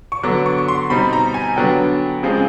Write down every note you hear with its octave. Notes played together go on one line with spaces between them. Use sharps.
C#6
D3 F#3 B3 D6
C#6
C#6
C6
B2 G3 C4 D#4 B5
A#5
G#5
D3 F#3 B3 D4 G5
C#3 F3 G#3 C4